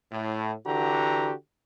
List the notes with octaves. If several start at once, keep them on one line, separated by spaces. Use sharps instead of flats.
A2
D3 E3 F#4 G4 A#5